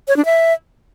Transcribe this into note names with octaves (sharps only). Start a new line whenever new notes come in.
C#5
D4
E5